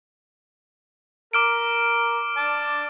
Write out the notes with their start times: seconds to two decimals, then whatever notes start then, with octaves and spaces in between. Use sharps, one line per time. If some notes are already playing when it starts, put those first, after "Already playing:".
1.33 A#4 D6 F6 D7
2.37 D5 A5